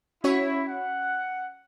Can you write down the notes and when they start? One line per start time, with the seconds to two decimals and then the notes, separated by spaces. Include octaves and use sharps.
0.24 C#4 E4 F#4 C#5
0.68 F#5